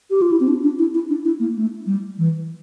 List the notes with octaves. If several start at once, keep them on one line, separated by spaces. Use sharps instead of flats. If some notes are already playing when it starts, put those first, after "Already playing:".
G4
F4
E4
C4
D4
D4
E4
E4
D4
E4
A#3
A3
G3
E3